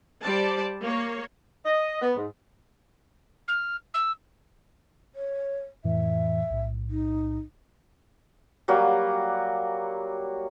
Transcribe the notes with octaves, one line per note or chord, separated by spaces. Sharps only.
G3 C5 D5 A5
A#3 C#5
D#5
B3
G#2
F6
E6
C#5
F2 A2 E3 E5
B1 A2
D#4
F#3 G3 A#3 F#4